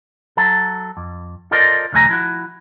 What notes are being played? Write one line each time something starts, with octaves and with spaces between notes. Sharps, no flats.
F#3 A4
F2
F4 A4 A#4 C5 D5 D#5
B1 E2 D3 A3 G#5 A#5
F3 E4 F#4